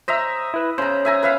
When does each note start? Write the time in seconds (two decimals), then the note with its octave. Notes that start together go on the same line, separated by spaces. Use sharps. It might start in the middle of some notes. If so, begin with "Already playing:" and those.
0.08 C5 D#5 E5 A#5
0.54 E4 B4
0.78 C#3 C5 A#5
1.05 E5 G#5 A#5
1.23 B4 E5 F5